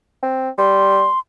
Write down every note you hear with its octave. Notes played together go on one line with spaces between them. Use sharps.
C4
G3 C6